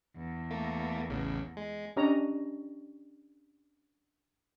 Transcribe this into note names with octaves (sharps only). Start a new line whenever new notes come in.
E2
A3 A#3
A1 C#3
G#3
C#4 D4 G4 C#5 D#5 A#5